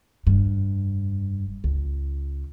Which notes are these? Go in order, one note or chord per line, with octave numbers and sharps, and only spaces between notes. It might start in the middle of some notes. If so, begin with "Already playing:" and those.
F1 G2
C#2